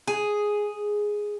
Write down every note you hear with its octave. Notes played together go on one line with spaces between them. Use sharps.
G#4